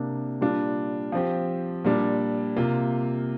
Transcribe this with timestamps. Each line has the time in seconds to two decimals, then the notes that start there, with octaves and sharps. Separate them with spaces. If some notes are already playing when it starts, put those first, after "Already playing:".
Already playing: C3 A#3 D4
0.41 A#2 G3 D4 F4
1.12 F3 C4 G4
1.84 A#2 G3 D4
2.56 C3 A#3 F4